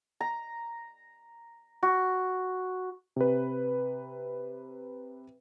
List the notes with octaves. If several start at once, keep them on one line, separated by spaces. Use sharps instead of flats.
A#5
F#4
C3 B4